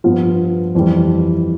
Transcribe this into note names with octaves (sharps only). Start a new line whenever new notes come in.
G2 F3 B3 F4
F2 E3 G3